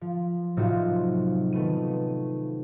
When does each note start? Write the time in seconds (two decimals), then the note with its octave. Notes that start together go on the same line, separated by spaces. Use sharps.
0.01 F3
0.57 A2 C3 F#3 D#4 F4 F#4
1.53 D#3 A3 B3 D#7